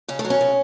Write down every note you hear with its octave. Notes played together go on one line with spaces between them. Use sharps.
C#3 C#4
A3
F#3
C#4
C#3